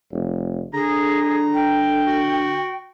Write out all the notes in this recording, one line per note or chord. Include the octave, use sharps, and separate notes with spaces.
F1
D3 G#4 A#5
G5
F#4